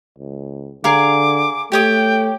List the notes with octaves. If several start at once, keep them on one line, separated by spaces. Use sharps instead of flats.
C#2
D3 G#4 A#4 F5 D6
A3 G4 C#5 G5 D#6